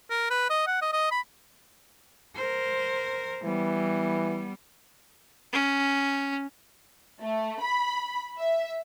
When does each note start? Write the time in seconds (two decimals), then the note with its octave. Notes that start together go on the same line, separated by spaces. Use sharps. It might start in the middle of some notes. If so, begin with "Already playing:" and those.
0.10 A#4
0.30 B4
0.50 D#5
0.67 F#5
0.82 D#5
0.93 D#5
1.11 B5
2.36 A#4 C5
3.44 E3 G3 B3
5.53 C#4
7.21 A3
7.62 B5
8.38 E5